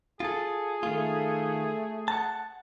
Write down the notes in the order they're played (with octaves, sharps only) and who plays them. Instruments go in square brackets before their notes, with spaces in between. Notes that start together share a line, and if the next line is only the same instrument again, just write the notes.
[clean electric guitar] F4 A4 [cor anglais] G#4
[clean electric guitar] D#3 F4 [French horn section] A3
[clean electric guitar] F#5 A5